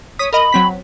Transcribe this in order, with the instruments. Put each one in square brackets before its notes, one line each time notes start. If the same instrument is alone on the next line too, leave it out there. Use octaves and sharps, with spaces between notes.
[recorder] C#5 [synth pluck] D#6 B6
[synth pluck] A#4 D#5 [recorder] B5
[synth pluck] F#3 C4 B6